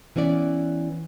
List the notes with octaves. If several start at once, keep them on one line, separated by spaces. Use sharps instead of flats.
E3 B3 C#4 D5